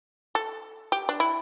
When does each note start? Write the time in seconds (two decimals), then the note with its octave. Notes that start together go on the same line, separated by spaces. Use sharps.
0.35 A4
0.92 G4
1.09 D4
1.20 E4